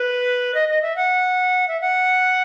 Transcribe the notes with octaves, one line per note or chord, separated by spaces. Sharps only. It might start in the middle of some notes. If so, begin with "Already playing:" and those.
Already playing: B4
D#5
D#5
E5
F#5
E5
F#5